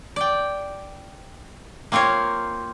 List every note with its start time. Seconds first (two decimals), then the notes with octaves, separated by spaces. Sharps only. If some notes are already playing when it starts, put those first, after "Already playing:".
0.16 D5 G5
1.92 A#3 C4 F4 A#4 C#5